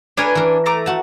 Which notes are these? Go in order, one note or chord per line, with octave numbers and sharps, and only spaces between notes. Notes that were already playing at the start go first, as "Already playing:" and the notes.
D4 A#4 B4 C#5 G#5
E3 A#4
A3 A#5 D6
F#4 A5